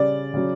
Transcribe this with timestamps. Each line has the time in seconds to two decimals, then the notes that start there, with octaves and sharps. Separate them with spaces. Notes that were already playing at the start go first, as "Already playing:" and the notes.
Already playing: C#3 G3 D5
0.34 C#3 F#3